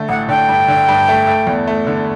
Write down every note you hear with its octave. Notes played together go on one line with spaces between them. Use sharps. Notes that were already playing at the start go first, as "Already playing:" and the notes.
Already playing: D3 A3
A1 F#5
D3 G5
G2
D3
G2
A3
A3
E2
A3
D3